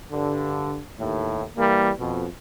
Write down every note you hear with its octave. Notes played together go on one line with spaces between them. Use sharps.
G2 D3
D#2 A2
E3 G3 A#3
F2 B2